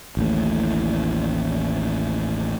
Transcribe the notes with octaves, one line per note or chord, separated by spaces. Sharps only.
A1 D#2 A2